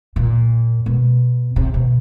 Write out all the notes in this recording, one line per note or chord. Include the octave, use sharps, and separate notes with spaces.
A#2
B2
C3
B2